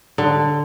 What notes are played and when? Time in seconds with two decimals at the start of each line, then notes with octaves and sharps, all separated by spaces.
0.18 D3